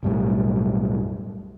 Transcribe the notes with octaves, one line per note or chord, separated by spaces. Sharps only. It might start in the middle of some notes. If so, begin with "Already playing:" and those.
B1 F#2 A2 G3